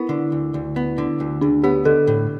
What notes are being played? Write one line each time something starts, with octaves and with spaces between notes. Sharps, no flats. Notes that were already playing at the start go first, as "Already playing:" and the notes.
Already playing: B3 E4
D3
D2
D2
B3
D3
D2
D2 D4
B3 G4
D3 A4
A2